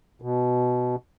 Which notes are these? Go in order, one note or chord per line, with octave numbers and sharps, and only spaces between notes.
B2